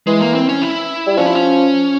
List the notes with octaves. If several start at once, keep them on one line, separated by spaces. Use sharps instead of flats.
E3 G#3
A#3
C4
C#4
E4
G3
F3 C#4
E4
C#4